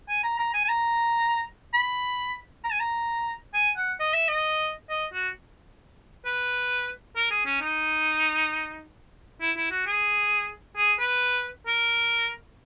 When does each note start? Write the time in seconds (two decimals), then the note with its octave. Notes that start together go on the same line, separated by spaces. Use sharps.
0.09 G#5
0.24 A#5
0.39 A#5
0.54 G#5
0.65 G#5
0.69 A#5
1.74 B5
2.64 A#5
2.72 G#5
2.80 A#5
3.54 G#5
3.77 F#5
4.00 D#5
4.13 E5
4.28 D#5
4.90 D#5
5.13 F#4
6.25 B4
7.16 A#4
7.31 G#4
7.46 C#4
7.61 D#4
9.41 E4
9.57 E4
9.71 F#4
9.86 G#4
10.77 G#4
10.99 B4
11.67 A#4